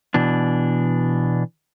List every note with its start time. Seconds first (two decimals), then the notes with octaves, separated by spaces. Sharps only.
0.14 B2 E3 D4